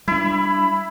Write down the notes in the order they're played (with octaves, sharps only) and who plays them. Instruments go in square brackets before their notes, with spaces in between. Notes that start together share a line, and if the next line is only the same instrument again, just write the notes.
[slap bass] G3 D4 [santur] E4 [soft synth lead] B5